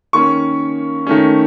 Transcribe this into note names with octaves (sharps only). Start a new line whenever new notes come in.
D#3 A#3 C#4 C#6
D#3 A3 C#4